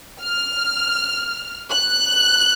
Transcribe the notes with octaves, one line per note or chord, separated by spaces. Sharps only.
F6
F#6